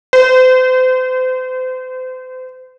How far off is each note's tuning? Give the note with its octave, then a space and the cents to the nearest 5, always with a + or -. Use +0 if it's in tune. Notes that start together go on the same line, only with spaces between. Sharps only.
C5 -35